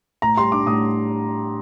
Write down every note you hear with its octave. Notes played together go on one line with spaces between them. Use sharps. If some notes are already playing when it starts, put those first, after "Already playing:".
A2 A#5
G3 C6
D4 D6
A2 D#6